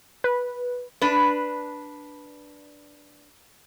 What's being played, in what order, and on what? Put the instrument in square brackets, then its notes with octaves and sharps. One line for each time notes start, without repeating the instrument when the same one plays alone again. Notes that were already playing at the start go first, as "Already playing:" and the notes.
[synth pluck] B4
[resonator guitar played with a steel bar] D4 B4